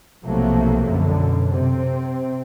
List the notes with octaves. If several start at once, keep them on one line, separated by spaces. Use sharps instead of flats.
B1 C3 F3 F#3 A3 A#3
F#2 B2 D3
C3 C4